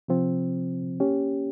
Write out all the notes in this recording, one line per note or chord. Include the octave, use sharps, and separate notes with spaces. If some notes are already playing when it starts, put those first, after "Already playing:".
C3 F3 C4
A#3 C#4 G4